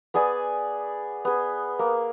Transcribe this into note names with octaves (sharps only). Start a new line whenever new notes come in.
B3 G#4 D5 G#5
B3 G#4
A#3